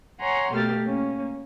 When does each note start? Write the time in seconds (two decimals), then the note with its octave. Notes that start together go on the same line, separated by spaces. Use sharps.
0.21 C#5 F#5 G#5 A#5 C6
0.52 B2 A3 A#3 G4 F6 A6
0.83 A#3 C#4